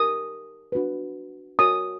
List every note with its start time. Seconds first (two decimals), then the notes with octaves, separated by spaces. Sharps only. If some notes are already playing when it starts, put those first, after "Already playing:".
Already playing: D#4 G4 A#4 D#6
0.72 D4 F#4 B4
1.59 F#4 A#4 C#5 D#6